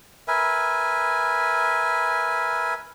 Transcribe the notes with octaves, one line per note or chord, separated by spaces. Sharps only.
A#4 B4 E5 G#5